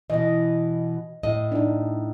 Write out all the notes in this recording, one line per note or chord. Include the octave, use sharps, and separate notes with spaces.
B2 E3 D#5
A2 D#5
D4 D#4